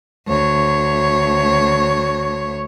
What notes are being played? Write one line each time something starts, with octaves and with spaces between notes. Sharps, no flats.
D2 C#5